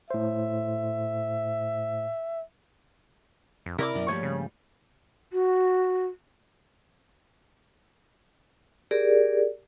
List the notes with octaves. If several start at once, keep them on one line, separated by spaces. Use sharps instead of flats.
A2 C5 E5
F2
C3 E4 A#4 D5 D6
F#2 B2 B3
G2 F3 G3 A3 A#3 C#5
C#3
F#4
G4 G#4 A#4 D5